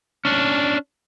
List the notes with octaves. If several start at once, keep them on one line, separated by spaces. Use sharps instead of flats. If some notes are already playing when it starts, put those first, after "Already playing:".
C#4 D4